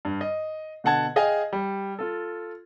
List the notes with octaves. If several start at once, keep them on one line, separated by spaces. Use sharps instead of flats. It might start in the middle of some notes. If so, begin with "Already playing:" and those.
G2
D#5
B2 D3 F#5 A5 G#6
G#4 D#5 F5 G5 G#5
G3
F4 A4